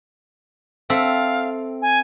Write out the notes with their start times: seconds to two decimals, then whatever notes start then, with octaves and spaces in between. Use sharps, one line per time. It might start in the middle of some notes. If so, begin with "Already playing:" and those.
0.90 C4 A4 E5 F5
1.82 G#5